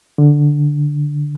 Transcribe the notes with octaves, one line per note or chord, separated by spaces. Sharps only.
D3